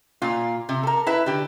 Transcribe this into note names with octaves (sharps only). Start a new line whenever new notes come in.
A#2 F4
C3
A4 A#4
E4 B4 E5
D3 G4